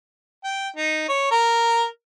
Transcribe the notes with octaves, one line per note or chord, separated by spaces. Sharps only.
G5
D#4
C#5
A#4